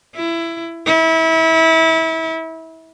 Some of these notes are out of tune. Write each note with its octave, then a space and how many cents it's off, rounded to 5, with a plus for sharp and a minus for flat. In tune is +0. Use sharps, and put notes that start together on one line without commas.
E4 +20
E4 -30